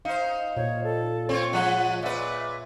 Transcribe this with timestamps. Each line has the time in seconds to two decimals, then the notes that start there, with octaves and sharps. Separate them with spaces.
0.05 D#4 C5 F5
0.57 A#2 C#5
0.83 A4
1.29 C4 F4 C#5
1.53 F3 G#3 F#5
2.02 A#2 B4 E5